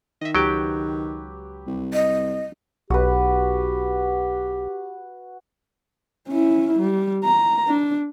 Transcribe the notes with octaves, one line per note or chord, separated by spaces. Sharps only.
D#3 D#5 E5
C#2 F#3 G4 B4 G5
C2
D#5
B1 F#4 G4 B4
C#4 E4
G3
A#5
D4